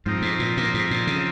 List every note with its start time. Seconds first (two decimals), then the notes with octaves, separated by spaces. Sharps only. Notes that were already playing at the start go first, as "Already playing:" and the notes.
0.06 G#2 F3 C4 D#4
0.22 G#2
0.39 A#2
0.57 A#2
0.74 G#2
0.91 A#2
1.07 C#3